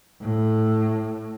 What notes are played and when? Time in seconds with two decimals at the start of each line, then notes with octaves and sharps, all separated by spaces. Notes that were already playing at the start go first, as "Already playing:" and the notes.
0.21 A2